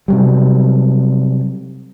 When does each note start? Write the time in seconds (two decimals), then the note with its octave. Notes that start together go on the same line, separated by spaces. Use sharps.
0.08 C3 F#3 G3